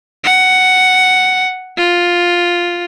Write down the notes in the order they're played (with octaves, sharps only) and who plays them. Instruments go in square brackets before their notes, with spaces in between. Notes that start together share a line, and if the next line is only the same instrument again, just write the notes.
[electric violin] F#5
F4